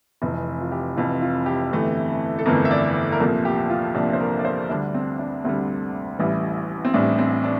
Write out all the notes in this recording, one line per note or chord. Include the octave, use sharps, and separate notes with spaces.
F1 F2 E3 E4
F4
G4
F1 F2 E3 F4
F4
G4
G1 F2 E3 A3
A4
G1 F2 E3 A3 A#4
E5
D5
A#4
C2 A#2 F3 A4
G4
F4
C2 A#2 F3 D4
C5
A#4
D5
C5
D2 D3 G3 D4
C4
D4
D2 D3 G3 C4
A1 A2 E3 G3
C4
A1 A2 E3 G3 D4
C4
D4